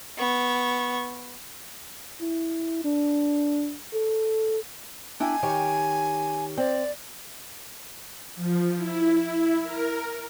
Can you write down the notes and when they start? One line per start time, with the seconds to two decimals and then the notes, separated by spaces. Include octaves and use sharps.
0.18 B3 C#6
2.21 E4
2.84 D4
3.93 A4
5.20 D4 E4 G5 G#5
5.43 D#3 G4 C#5
6.57 C4 D5
8.36 F3
8.77 E4
9.63 A#4